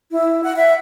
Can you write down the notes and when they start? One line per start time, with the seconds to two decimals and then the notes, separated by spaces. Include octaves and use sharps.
0.12 E4
0.44 F#5
0.56 E5